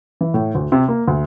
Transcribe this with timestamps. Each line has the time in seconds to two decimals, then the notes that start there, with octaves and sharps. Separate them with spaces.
0.21 E3
0.34 A2
0.55 D2
0.72 C3
0.88 A#3
1.08 D2